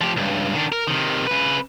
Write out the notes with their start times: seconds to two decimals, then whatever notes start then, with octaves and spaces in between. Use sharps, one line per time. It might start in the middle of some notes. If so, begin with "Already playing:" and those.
0.01 F3 G4
0.17 C#2 G2
0.54 D#3 D4
0.72 A#4
0.88 C3 D#3
1.27 C#3 B4